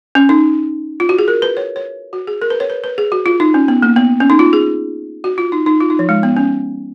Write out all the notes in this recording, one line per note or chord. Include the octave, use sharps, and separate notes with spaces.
C#4
D#4
F4
F#4
G#4
A#4
B4
C#5
C#5
F#4
G#4
A#4
B4
C#5
B4
B4
G#4
F#4
F4
D#4
C#4
B3
A#3
B3
C#4
D#4
F4
G#4
F#4
F4
D#4
D#4
F4
D#4
F3
G#3
B3
C#4